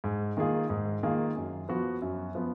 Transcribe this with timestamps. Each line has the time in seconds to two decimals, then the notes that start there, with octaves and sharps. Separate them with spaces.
0.04 G#2
0.37 D#3 A#3 F4 G#4
0.70 G#2
1.03 D#3 A#3 F4 G#4
1.36 F#2
1.69 F3 B3 F#4
2.02 F#2
2.35 F3 B3